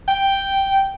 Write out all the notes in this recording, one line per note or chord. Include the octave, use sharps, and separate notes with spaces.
G5